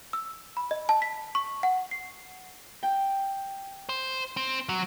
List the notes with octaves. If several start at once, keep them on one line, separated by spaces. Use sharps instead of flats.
E6
B5
D#5
A5
B6
C#6
F#5
C7
G5
C5
C4
F#3